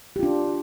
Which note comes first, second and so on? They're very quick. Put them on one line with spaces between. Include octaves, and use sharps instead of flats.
G4 F4 D4